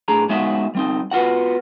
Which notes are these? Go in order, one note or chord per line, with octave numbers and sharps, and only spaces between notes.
A2 D4 G#4 A#5
G#3 B3 D#4 F#4 E5 F#5
G3 C4 D#4
B3 F4 F#4 F#5